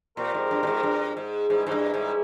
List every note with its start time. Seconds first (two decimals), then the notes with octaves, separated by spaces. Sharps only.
0.17 A#2 F3 C4 G4 A#4
0.34 G#2
0.51 G2
0.63 A#2
0.67 G#2
0.83 G2
1.17 G#2
1.49 G#2 E3 G3 C#4 E4 A#4
1.67 G#2
1.72 G2
1.94 G#2